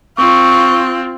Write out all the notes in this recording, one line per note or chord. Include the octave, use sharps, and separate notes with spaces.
C4 F4 C#6